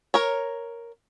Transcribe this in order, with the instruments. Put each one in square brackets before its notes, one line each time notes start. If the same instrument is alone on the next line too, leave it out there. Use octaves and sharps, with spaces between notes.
[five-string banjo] A#4 C#5